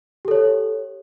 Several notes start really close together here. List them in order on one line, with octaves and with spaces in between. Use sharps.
G4 A4 C#5